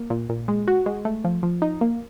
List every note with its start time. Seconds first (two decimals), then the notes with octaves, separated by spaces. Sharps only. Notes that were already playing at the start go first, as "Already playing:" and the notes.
Already playing: A#3
0.10 A#2
0.29 A#2
0.48 G#3
0.68 F#4
0.86 G#3
1.05 A3
1.24 F3
1.43 F3
1.62 D#4
1.81 A#3